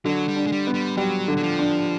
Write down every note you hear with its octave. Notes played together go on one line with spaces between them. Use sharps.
D3 F#3
G3
D4
G#3
G3
B3
G3
F#3 G3
D3
F#3
F3
D4